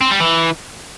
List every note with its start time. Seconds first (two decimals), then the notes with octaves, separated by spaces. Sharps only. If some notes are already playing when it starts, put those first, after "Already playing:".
0.01 C4
0.11 G3
0.20 E3